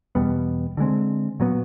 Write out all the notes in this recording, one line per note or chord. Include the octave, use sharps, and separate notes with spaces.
E2 B2 G3 B3
D3 F3 G#3 C4
A#2 F#3 B3